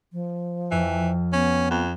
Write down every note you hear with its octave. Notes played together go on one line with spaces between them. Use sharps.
F3
F2 E3
B3 C#4
F2